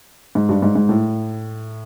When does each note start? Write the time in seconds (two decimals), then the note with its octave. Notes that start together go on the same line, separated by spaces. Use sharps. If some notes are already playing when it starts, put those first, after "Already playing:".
0.35 G#2
0.49 G2
0.62 G#2
0.75 G#2
0.89 A2